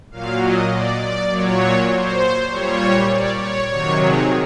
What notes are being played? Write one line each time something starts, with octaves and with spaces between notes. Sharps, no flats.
A#2 F#3 F5
D#5
D5
D5
A#2 F#3 C#5
C5
A#2 G3 C#5
D5
C#5
C3 D#3 F#3 C#5
G#4